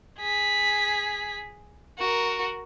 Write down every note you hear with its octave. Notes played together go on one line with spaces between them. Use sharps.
G#4 B6
F#4 A#4